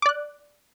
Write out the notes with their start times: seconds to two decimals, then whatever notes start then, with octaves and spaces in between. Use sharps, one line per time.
0.02 D6
0.06 D5
0.09 F#6